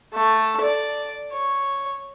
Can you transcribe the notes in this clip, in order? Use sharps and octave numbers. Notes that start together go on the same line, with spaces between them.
A3
D5
C#5